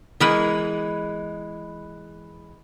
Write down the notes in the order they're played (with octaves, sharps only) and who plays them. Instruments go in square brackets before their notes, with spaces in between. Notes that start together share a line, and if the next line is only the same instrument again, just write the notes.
[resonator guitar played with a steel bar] E3 G#3 [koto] B3 A#4 B4